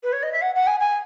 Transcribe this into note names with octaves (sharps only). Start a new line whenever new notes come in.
B4
C#5
D#5
E5
F#5
F#5
G#5
G#5